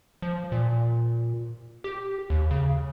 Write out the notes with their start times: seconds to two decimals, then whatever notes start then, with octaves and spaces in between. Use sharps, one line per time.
0.22 F3
0.52 A#2
1.84 G4
2.30 D#2
2.51 C#3